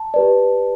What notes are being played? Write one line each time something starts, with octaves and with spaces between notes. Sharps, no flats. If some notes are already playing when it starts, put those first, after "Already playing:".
Already playing: A5
G4 B4 D5